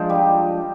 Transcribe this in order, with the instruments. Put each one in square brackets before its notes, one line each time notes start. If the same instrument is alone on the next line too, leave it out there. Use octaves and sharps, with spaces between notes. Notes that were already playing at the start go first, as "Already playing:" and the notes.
Already playing: [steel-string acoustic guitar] F3 G#3 D4 [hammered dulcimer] D#4 F4
[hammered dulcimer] G3 G4